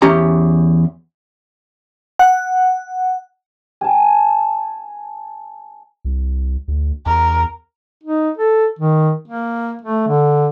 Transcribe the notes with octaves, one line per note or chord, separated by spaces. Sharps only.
E2 C#4 G4 A#5
F#5
G#5 A5
C2
D2
E2 A#4
D#4
A4
D#3
A#3
A3
D3